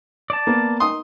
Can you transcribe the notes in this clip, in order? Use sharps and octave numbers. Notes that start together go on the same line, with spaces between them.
D5 A5
A#3 B3
D#4 C6 D#6